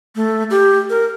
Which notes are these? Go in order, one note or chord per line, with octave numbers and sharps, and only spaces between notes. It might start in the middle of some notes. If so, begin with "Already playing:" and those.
A3
G4
A#4